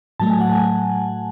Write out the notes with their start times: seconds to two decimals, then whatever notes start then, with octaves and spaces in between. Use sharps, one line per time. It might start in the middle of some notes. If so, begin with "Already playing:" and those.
0.20 A2 F#3 A3 A5
0.30 G#5
0.41 F#5
0.51 G#5